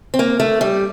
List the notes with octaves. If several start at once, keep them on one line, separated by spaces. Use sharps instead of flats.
C4
A#3
A3
G3